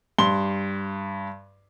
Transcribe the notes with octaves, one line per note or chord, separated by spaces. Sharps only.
G2 C6 G7